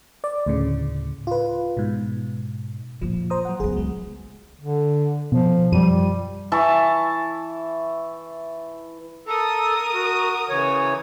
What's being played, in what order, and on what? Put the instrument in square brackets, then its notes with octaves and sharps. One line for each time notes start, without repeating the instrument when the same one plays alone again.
[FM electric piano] D5
D2 A2 C#3
F4 B4
G#2 B2
[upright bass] A#2 A#3 [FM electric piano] F3
[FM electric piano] C5 A#5 D#6
F#3 F#5
[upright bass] C#2 B3 [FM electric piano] G#4
[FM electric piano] F#3 G#3
[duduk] D3
[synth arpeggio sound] B2 [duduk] F3
[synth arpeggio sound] F#2 F3 D#7 [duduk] G3
[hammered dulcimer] E3 E5 A5 C#6
[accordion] A4 [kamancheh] A#4 D#6
[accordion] F#4
C#3 E3 C#5